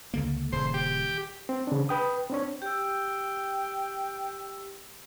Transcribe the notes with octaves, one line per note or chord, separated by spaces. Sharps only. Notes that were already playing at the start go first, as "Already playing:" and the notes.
C#2 D3 A#3
D#1 C#3 C5
G4
C4
C#3 D4
B4 G5 D#6
C4 D4 C#5
G4 G5 E6